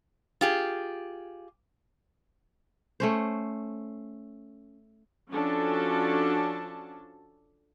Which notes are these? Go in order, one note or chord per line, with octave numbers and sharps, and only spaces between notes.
F4 G4 G#4
A3 C#4 C5
F3 C#4 D4 F#4 A4 A5